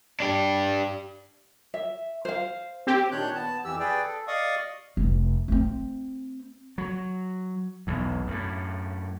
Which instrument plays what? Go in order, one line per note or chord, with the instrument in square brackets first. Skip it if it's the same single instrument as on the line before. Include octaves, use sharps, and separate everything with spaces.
[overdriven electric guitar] D4 G4
[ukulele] E5
C5 F5
[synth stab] C4 G4
[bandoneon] A#2 D#3 D4 C#5 F#6 G6
B3 A5
F2 E3 G4 E6
G#4 B4 D5 G5
A4
D5 D#5 F5 C#6 D#6
[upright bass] F1
A3 C4
[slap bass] F#3
B1 E2
F#2 A2